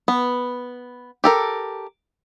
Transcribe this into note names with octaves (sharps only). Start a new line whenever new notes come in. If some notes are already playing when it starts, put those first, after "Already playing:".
B3
G4 A4 A#4